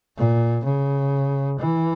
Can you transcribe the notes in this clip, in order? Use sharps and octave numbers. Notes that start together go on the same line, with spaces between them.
A#2
C#3
E3